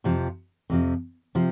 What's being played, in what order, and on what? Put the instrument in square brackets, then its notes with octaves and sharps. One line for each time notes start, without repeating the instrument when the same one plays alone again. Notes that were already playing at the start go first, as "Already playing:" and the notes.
[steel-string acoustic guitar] F2 C3 F3
F2 C3 F3
C3 F3